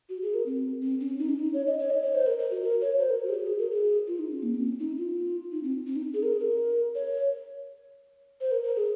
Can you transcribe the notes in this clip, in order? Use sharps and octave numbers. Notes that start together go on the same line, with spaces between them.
F#4
G#4
A#4
C4
C4
C#4
D#4
C#4
D#4
C#5
D#5
C#5
D#5
C#5
C5
A#4
A#4
F#4
A#4
C#5
C5
A#4
F#4
G#4
F#4
G#4
A#4
G#4
F4
D#4
C#4
A#3
C4
C#4
D#4
F4
D#4
C4
C4
D#4
G#4
A#4
G#4
A#4
C#5
C5
A#4
A#4
G#4